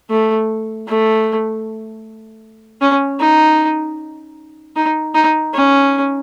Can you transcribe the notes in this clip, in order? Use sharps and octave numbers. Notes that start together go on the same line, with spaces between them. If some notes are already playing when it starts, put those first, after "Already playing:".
A3
A3
C#4
D#4
D#4
D#4
C#4